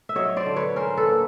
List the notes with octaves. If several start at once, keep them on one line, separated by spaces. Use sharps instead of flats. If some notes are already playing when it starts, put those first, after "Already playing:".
E5
F#3 C#5 D#5
C5 D5
D3
B4 C#5
C#4 A#4 C5
A4 B4
A#3